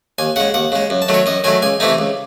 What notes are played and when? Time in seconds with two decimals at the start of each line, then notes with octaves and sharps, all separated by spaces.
0.18 D#2 G#5
0.36 C#3 G#3 F#5
0.54 D#2 F#5
0.72 C#3 G#3
0.90 F#2
1.02 A5
1.08 D#3 F#3 A3
1.14 C#5
1.26 F#2 D#5
1.44 D#3 F#3 A3 G#5
1.62 C#2 G#5
1.80 C3 E3 A3 D#4
1.98 C#2